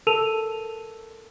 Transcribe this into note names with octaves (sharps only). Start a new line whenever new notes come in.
A4 A#4 A5 E6 D#7 F7